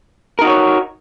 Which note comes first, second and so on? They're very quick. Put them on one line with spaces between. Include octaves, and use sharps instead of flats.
A#4 D#4 F#4 C#5